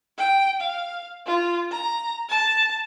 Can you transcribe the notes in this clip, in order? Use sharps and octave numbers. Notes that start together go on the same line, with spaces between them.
G5
F5
F4
A#5
A5